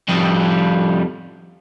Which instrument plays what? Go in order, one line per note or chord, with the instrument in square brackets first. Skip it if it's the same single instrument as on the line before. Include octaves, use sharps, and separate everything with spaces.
[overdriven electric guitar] F2 G3